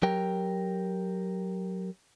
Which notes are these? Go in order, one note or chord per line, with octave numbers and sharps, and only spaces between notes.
F#3 G4 A#4 G5